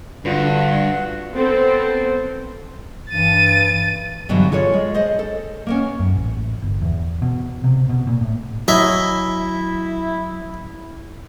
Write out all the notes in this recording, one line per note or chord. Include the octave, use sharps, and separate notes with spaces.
G2 D3 D4 F4 F#4 B4
B3 C4 A4 C5
G2 E3 A6 D#7
G2 B2 D3 E3 F#3
F4 G#4 A4 C#5
G#3
G#4 C5 D#5
A4
A#3 B3 C#4
F#2
A1
G1
E2
B2
C3
B2
A#2
A2
F#3 E4 D#5 E5 G#5